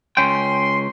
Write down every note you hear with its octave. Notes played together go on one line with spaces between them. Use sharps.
C#2 C#4 G5 C6